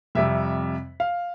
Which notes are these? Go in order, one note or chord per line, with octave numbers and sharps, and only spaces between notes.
F2 C3 G3 E5
F5